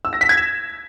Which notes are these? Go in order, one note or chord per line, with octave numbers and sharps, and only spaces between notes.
E6
A#6
B6
G#6
E7